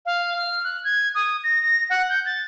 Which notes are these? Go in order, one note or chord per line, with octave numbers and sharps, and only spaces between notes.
F5
F6
F#6
G#6
D#6
A#6
A#6
F#5
G6
A6